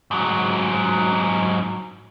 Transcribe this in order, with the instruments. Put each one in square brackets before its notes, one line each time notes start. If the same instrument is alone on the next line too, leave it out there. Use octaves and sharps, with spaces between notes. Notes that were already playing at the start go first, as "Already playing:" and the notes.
[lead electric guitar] G#2 F#3